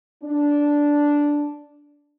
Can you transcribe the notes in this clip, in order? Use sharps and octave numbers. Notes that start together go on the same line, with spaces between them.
D4